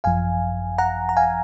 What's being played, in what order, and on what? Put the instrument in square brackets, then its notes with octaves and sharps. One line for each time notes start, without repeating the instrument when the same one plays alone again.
[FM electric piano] G#1 F#2 F3 F5 G#5
F#5 A#5
A#5
F5 G#5